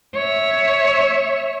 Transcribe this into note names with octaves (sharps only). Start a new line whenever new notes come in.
C#5 E5